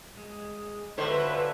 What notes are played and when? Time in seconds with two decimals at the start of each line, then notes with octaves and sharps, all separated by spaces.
0.17 G#3
0.98 D3 C#4 F4 F#4 B4 C5 E5